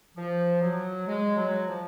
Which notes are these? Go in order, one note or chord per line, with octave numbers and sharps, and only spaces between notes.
F3
F#3
G#3
F#3
F3